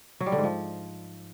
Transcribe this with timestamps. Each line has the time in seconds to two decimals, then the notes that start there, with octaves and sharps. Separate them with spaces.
0.20 F#3
0.26 G3
0.32 D3
0.38 G#2
0.44 F3